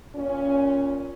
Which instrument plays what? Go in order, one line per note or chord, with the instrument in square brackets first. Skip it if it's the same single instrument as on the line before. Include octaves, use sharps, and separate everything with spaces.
[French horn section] A#2 C#4